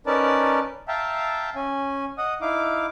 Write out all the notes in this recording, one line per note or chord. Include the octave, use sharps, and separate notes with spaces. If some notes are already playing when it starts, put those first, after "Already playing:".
C#4 D#4 A#4 B4 D5 A5
E5 F5 G5 A5 A#5
C#4 G#5
D#5 F#5 D#6
D#4 E4 F5 D6